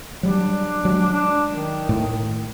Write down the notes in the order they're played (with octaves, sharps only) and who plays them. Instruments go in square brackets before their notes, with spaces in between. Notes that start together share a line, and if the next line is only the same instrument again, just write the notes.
[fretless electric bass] F#3 G3 [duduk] D4
[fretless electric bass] F#3 G#3
[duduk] D4
D#3
[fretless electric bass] A2 A3